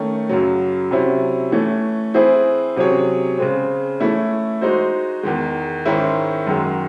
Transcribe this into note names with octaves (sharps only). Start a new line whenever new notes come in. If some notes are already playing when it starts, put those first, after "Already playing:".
Already playing: D#3 A3 C#4
F#2 C#3 F#3
C3 F#3 C#4 E4
E3 A3 C#4
E3 C4 E4 G#4 C5
C3 F#3 C#4 G#4 C#5
C#3 G#3 C4
E3 A3 C#4 E4
G#3 D#4 F#4 C5
E2 D#3 G#3
G#2 D#3 G#3 C#4 E4
F#2 D#3 G#3